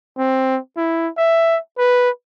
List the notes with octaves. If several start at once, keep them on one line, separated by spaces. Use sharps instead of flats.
C4
E4
E5
B4